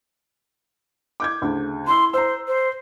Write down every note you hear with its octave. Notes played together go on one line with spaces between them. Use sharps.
D6 G6 G#6
D2 C#3
E4 C6 E6
C5 A#5 E6
C5